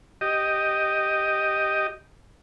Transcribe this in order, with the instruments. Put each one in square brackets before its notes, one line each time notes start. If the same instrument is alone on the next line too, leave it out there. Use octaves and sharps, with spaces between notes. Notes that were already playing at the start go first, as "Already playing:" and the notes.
[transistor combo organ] G4 D#5